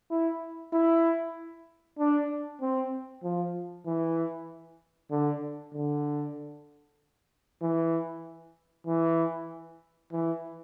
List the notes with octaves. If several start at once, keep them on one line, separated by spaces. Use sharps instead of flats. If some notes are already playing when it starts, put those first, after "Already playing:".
E4
E4
D4
C4
F3
E3
D3
D3
E3
E3
E3